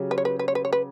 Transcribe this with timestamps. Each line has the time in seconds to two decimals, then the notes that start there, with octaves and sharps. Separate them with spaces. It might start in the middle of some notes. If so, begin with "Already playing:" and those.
Already playing: C#3 F#3 C#4 G4
0.11 B4
0.18 C#5
0.25 B4
0.39 B4
0.48 C#5
0.55 B4
0.65 C#5
0.73 B4